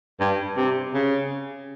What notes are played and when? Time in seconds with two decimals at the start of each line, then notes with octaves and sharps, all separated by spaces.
0.20 G2
0.57 C3
0.94 C#3